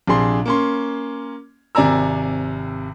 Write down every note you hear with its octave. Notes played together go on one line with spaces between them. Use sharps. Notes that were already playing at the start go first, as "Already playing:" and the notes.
A#1 C3 D4 G#4 C6
A#3 C#4 C6
G#1 C3 D5 G#5 A#5 E6